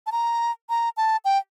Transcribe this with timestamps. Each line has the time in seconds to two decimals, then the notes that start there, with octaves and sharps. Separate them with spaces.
0.06 A5
0.12 A#5
0.69 A#5
0.97 A5
1.25 G5